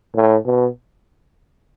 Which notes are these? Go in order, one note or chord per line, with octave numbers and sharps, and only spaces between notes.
A2
B2